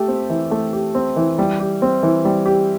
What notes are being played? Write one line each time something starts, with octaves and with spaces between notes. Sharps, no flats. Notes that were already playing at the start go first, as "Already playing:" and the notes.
Already playing: A3 G4
C4
E3
A3
G4
C4
E3
G3
G4
C4
E3
G3
G4